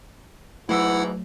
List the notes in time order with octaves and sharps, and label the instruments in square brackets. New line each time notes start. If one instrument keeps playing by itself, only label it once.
[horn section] G#2 B2 E3 [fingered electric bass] F#3 A3 [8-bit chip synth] E4 F#5 E6